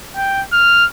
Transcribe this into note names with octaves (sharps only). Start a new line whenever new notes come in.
G5
F6